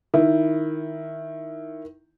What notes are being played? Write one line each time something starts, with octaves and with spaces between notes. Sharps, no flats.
D#3 E4